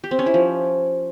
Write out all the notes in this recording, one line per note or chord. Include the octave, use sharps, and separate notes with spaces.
G4
C4
C#4
E4
F3